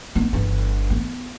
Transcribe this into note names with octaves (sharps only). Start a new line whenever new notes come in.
B3 D#4
G1 E3
B3